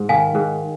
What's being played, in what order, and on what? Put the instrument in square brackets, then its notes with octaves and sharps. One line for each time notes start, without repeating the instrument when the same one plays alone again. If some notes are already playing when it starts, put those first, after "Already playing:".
Already playing: [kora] G#2
[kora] D#3 [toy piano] F5 G#5
[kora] G#2